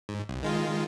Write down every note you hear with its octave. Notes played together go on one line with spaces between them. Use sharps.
G#2
C2
D#3 G#3 F4